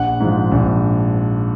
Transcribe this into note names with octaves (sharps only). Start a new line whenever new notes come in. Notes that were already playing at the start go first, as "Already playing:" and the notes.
Already playing: A#1 F#5
G#2 F3
A#1